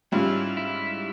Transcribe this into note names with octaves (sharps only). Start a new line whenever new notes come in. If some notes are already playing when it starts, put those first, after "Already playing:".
G#2 G3 C#4 E4 F4
E4